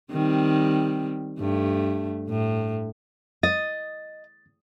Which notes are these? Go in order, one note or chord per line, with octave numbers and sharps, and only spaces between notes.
D#3 G3 C4
G2 A3
A2
D#5 A6